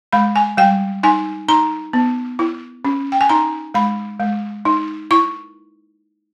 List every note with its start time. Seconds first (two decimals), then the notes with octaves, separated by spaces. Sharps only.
0.13 G#3 B5
0.36 G#5
0.57 G3 G5
1.03 D#4 G#5
1.49 D#4 A#5
1.93 B3
2.39 E4
2.85 C#4
3.12 G5
3.21 G#5
3.29 D#4 A#5
3.74 G#3 B5
4.20 G#3
4.65 D#4
5.11 E4 C#6